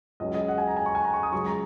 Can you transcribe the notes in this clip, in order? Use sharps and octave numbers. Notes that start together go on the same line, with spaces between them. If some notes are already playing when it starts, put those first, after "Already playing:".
C#2 C#3 F#3 D#5
D#5
F#5
G#5
A#5
G#5
C#6
G#5
A#5
C#6
D#6
C#2 C#3 F#3 C#6
A#5